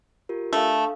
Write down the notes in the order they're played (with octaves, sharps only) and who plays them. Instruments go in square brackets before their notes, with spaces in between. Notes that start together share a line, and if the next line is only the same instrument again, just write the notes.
[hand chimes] F4 G4 A#4
[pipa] A3 [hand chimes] D4 A4 F5